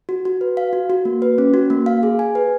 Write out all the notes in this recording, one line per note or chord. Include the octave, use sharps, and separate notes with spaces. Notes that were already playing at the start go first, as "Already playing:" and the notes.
F#4
F#4
B4
F5
F#4
F#4
A#3
B4
C#4
F#4
A#3
F5
G#4
G#5
B4